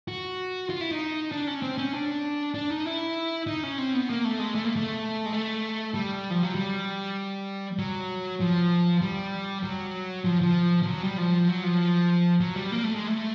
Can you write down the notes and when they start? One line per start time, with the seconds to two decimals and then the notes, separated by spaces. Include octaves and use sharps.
0.08 F#4
0.70 F4
0.81 E4
0.91 D#4
1.32 D4
1.47 C#4
1.62 C4
1.78 C#4
1.93 D4
2.55 D4
2.70 D#4
2.86 E4
3.47 D#4
3.63 C#4
3.78 C4
3.94 B3
4.10 A#3
4.25 A3
4.39 G#3
4.55 A3
4.65 A#3
4.76 A3
5.26 G#3
5.33 A3
5.94 G3
6.30 F3
6.43 F#3
6.55 G3
7.79 F#3
8.41 F3
9.02 G3
9.64 F#3
10.25 F3
10.41 F3
10.82 F3
10.86 F#3
11.03 G3
11.18 F3
11.48 F#3
11.63 F3
12.40 F#3
12.56 G3
12.72 A#3
12.83 A3
12.95 G#3
13.07 A3